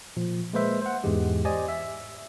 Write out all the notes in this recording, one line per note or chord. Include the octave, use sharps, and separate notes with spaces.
A#2 F3
G#3 A#3 B4 C5 E5
C5 F#5
E2 G#2 E3 G#3 G4
G4 C5 D5 D#5 G#5
E5